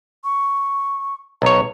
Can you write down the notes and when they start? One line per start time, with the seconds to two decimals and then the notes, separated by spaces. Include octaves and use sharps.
0.24 C#6
1.42 B1 C#5 A#5